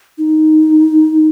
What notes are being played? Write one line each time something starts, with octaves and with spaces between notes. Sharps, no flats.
D#4